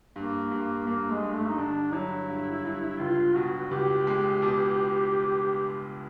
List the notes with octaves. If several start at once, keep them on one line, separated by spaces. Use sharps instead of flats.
G2 A#3
G2
G2 A#3
G#3
G2
A3
D#4
D3 D4
F#3 E4
G2
G2
C#2 F4
B2 F#4
C#2 G4
G#3
B2